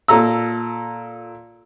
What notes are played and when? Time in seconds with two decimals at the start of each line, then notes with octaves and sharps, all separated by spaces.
0.08 A#2 A4 A#5 E6